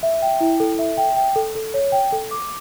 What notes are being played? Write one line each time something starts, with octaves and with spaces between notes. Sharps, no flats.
E5
G5
E4
A4
E5
G5
G5
A4
A4
C#5
G5
A4
D6